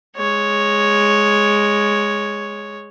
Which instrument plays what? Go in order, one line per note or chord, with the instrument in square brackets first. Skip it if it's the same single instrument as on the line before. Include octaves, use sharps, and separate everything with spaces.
[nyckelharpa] G#3 C#5